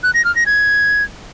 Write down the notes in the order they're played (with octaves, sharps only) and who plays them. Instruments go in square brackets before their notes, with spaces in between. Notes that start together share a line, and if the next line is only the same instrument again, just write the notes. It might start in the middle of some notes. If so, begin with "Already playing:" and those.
[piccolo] F#6
A#6
F6
A#6
G#6